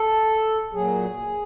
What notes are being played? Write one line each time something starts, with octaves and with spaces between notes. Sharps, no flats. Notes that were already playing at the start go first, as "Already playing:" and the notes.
Already playing: A4
A#2 F#3 G#4